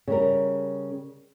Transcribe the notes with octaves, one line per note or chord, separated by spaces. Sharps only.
C#3 G3 A#4